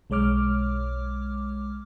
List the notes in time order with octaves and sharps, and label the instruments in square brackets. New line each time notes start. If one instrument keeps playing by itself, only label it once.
[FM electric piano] B1 G#3 C#5 D6 F6